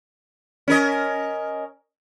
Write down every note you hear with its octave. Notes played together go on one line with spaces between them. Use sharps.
C#4 A#4 D#5